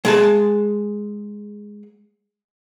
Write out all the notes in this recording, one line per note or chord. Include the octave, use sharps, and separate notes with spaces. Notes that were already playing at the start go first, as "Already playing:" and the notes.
G#3 G#4 A5